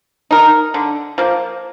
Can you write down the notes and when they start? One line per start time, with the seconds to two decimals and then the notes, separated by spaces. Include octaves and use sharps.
0.31 D#4 A#4
0.74 D3
1.18 F3 A#3